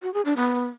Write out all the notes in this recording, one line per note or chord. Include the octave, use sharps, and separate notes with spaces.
F#4
G#4
D4
B3